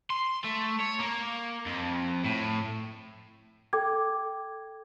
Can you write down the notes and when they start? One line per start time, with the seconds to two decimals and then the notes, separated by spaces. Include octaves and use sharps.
0.10 C6
0.45 A3
0.80 C#5
1.00 A#3
1.66 F2
2.25 A2
3.73 A4 G5 D6 G#6